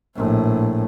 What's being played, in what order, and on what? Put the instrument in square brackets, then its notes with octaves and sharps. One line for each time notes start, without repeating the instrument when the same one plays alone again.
[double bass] A#1 A2